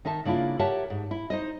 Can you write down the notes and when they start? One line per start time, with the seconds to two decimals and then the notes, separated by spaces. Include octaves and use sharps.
0.05 D#3 D#4 E5 A5
0.25 C#3 A#3 D4 E4 F4
0.59 G4 A#4 C#5 E5 F#5 A5
0.90 G#2
1.11 E4
1.30 D#4 C5 D#5